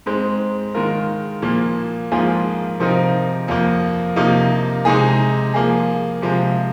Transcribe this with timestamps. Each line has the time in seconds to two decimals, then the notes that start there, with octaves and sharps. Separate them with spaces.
0.06 G#2 G#3 C4
0.75 D#3 G#3 F4 A#4
1.42 A#2 F3 A#3
2.12 G#2 F3 A#3 F4 G#4
2.80 C3 F3 C4 D#4 A#4
3.48 F2 F3 A#3
4.16 C3 F3 A#3 D#4
4.85 C3 G#3 D#4 G#4
5.54 F3 A#3 G#4
6.22 C3 F3 G#3